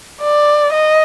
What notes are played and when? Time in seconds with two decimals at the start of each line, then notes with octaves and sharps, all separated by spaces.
0.21 D5
0.73 D#5